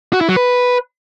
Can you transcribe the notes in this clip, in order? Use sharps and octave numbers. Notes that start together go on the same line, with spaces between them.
F#4
E4
F#3
B4